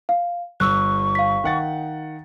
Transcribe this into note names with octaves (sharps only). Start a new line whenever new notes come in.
F5
G1 C#6 E6 F#6
F5 B6
D#3 F#5 A6